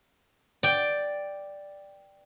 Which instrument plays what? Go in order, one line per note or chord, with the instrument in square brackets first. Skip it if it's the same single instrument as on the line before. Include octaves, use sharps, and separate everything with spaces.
[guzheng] D5 G5